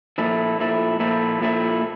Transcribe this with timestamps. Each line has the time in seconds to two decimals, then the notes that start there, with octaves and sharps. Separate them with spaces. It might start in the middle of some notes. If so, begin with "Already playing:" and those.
0.18 A#2 F3 A3 E4
0.59 A#2 F3 A3 E4
1.00 A#2 F3 A3 E4
1.41 A#2 F3 A3 E4